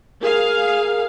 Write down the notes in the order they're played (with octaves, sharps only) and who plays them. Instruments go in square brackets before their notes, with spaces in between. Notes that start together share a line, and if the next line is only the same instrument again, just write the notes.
[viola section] G#4 F5 [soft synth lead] A#4